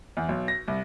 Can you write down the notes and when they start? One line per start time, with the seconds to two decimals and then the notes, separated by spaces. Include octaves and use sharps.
0.17 E2
0.29 B1
0.48 A#6
0.68 C2